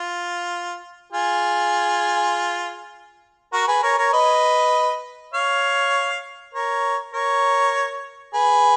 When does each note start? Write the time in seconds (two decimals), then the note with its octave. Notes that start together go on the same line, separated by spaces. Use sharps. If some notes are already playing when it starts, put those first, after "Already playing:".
Already playing: F4
1.13 F4 G#4
3.53 F#4 A#4
3.68 G#4 B4
3.83 A#4 C#5
3.98 A#4 C#5
4.13 B4 D#5
5.34 C#5 F5
6.54 A#4 C#5
7.14 A#4 C#5
8.34 G#4 B4